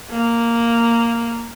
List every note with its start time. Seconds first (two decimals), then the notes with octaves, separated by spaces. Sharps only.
0.11 A#3